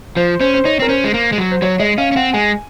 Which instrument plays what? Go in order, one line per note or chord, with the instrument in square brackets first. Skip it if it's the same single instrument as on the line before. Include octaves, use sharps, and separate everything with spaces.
[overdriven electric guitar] F3 [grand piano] C5
[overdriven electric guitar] C#4 [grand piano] C5
[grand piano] C5
[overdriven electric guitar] D#4 [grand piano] C#5
[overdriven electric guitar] C4 [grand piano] A#4
[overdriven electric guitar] C#4 [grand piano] C5
[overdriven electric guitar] G#3
A#3
G#3
F#3
[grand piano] C5
[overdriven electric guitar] F#3 [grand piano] C#5
[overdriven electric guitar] G#3 [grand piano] D#5
[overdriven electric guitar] C#4 [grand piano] F5
[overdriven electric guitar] C#4
[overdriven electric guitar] C4 [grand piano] F#5
[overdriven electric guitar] G#3 [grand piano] G#5